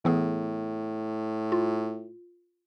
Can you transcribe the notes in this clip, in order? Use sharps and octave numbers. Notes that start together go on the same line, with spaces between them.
A2 E3 B3 G#4
F4